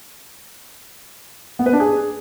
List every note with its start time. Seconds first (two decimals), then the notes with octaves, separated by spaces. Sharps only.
1.59 B3
1.66 B4
1.73 D4
1.80 G#4